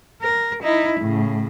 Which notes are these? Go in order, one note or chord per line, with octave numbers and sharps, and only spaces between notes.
A#4
D#4 E4
A2 C#3